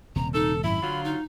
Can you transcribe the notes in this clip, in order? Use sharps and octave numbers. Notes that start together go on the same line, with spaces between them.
D#1 C3 A#5
D#4 A4
G#1 F#2 A2 E4 B5
D3 F#3 F4
D#4